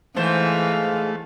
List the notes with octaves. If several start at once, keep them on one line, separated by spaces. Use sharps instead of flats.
G#2 E3 A3 C5 F5